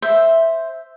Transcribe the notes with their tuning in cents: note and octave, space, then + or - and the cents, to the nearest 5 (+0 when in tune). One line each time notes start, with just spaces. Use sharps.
C5 +0 E5 +0